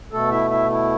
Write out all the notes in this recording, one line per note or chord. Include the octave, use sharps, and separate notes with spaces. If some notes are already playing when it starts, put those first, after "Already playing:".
B2 A3 A4
E4 E5
E4 E5
E4